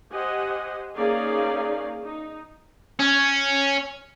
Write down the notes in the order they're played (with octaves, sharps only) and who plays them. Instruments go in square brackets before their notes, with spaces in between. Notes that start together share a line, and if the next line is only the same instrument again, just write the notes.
[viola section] G4 C5 D#5 F#5 G#5
A#3 C#4 D#4 G#4 D5 F5
D#4
[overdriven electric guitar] C#4